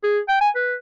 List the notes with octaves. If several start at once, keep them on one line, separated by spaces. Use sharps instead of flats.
G#4
G5
G#5
B4